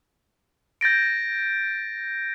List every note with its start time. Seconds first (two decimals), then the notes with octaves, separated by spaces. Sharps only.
0.81 G6 A6 A#6 D7